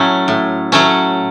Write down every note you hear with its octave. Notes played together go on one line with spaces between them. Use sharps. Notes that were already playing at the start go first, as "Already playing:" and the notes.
Already playing: A2 F#3 A3 C#4
A2
F#3 A3 C#4